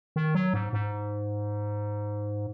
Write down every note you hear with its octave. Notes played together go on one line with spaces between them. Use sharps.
D#3
F#3
G#2
G#2